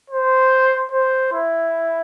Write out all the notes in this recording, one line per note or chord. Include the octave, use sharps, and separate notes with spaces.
C5
C5
E4